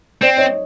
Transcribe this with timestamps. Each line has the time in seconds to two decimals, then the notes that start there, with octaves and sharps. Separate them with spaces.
0.22 C4 C5 D5
0.38 C#5 D#5